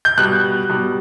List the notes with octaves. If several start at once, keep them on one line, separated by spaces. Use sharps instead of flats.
G6
B2 G3 F#6
B2 G3